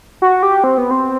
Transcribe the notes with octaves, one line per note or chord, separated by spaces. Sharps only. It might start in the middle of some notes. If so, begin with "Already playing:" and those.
F#4
G4
C4
B3
C4